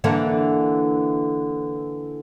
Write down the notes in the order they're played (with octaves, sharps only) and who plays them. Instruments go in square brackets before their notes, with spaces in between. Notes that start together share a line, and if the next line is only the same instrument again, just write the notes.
[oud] D3 E3 A#3